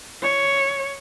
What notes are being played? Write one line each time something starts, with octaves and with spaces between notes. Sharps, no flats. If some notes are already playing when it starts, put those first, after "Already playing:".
C#5